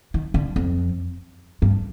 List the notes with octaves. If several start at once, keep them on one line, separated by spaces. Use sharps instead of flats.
D#3
D3
F2
G2